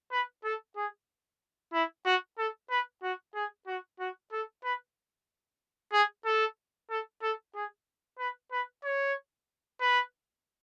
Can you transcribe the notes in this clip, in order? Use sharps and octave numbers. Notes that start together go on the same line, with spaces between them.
B4
A4
G#4
E4
F#4
A4
B4
F#4
G#4
F#4
F#4
A4
B4
G#4
A4
A4
A4
G#4
B4
B4
C#5
B4